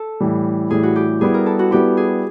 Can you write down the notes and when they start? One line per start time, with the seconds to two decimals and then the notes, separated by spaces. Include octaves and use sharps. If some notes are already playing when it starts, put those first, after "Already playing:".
Already playing: A4
0.21 A2 E3 G3
0.70 A2 E3 G3 G#4
0.83 F#4
0.96 G4
1.21 G3 B3 E4 G#4
1.34 A#4
1.46 A4
1.59 F#4
1.71 G3 B3 E4 G4
1.97 G#4